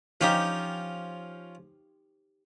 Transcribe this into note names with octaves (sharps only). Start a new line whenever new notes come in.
F3 C#4 D#4 F4 G4 C5